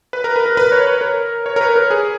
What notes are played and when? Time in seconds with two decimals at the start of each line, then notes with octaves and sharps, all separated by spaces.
0.13 B4
0.24 A#4
0.36 B4
0.46 A#4
0.57 B4
0.72 C#5
0.87 B4
1.01 A#4
1.46 C#5
1.56 A#4
1.61 B4
1.76 A#4
1.90 G#4